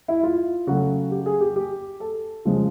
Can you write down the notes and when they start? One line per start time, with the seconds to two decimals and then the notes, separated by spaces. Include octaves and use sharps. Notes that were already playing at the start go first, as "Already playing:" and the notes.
0.08 E4
0.23 F4
0.67 C#3 F#3 A3 F#4
1.12 G4
1.26 G#4
1.41 G4
1.56 G4
2.00 A4
2.45 C#3 F3 G#3